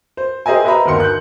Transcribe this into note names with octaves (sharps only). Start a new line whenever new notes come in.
C5
G4 G#4 C5 D#5 E5 G#5
B4 C5 D#5 E5 A#5 B5
G1 D#2 D#3 A#4 C6 C#7
F#6 G6